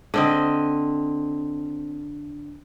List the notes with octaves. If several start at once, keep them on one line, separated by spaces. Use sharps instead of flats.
D3 C4 D#5